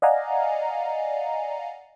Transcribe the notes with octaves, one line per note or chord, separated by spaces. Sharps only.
D5 D#5 F5 F#5 G#5 A#5